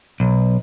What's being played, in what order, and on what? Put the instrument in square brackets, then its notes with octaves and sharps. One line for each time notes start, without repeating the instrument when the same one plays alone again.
[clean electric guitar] B1